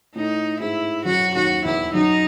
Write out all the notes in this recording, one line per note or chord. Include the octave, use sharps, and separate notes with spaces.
A2 A3 D#4
G#2 G#3 E4
F#2 F#3 F#4
D#2 D#3 F#4
E2 E3 E4
F#2 F#3 D#4